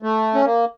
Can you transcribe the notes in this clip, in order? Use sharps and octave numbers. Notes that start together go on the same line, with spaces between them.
A3
C#4
A#3